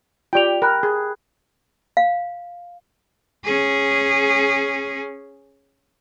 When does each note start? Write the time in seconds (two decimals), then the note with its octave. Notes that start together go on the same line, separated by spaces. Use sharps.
0.33 F4 G4 D5 G5 F7
0.62 A#4 G5 B5 F#6
0.83 G#4
1.97 F5
3.44 C#4 G#4